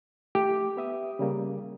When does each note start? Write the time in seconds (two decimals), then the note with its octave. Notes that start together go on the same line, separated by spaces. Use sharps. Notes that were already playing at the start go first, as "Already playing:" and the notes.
0.35 A3 G4
0.77 B3 E5 D#6
1.19 C#3 G3 A#3